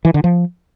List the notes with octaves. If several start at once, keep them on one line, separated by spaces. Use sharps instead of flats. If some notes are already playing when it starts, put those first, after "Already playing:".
E3
D3
F3